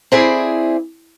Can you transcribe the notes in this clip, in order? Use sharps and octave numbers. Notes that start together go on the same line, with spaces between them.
C4 E4 G#4 D5